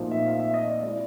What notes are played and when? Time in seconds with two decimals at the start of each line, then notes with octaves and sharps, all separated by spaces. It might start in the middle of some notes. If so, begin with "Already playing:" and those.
Already playing: A#2 F3 A3 C4 D#4
0.11 E5
0.26 F5
0.39 E5
0.54 D#5
0.67 D5
0.82 G#3 C4 E4 D5